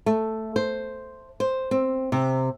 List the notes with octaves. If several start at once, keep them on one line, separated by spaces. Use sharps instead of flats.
A3
C5
C5
C4
C3